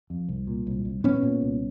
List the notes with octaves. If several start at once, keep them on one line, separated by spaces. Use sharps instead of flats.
F2
C2
A#2
C2
C2
A#2 B3 C#4
A#2
C2